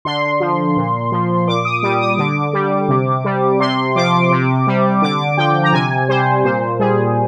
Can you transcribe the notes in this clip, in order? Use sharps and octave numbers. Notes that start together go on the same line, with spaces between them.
D3 C6
F3
A#2
F3
A#2 D6
D#6
G3 D6
D#6
D3 D6
G3
C3
G3
C3 C6
F3 D6
C3
G3
D3 D6
F3 G5
A#5
C3 G#5
G3 C5
A#2 C5
G3 G#4